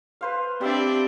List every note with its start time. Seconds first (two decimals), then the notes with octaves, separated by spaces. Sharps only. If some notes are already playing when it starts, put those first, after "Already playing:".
0.21 B4 C5 F5
0.61 G3 C4 D4 D5 E5 G5